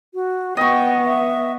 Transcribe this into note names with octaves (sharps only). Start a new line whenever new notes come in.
F#4
B3 D#5 G5 C#6
E5